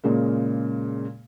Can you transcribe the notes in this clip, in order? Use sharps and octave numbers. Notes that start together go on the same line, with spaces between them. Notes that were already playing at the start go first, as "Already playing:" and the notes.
A#2 C#3 G#3 A#3